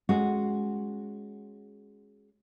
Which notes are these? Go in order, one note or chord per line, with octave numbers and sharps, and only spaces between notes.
G#3 C#4 F#4